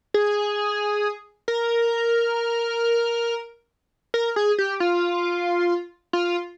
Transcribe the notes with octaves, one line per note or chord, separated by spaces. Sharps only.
G#4
A#4
A#4
G#4
G4
F4
F4